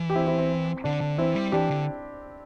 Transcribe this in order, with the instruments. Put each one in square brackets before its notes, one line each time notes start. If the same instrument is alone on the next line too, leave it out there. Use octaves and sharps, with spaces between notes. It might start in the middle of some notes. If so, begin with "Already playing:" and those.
Already playing: [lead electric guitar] E3
[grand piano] G4
C4 E4
C4 E4
C4
[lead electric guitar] D3 [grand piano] D4
[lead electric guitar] D3
[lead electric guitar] E3 [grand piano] C4 E4
[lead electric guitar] G3
[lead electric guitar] E3 [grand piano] D4 G4
[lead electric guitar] D3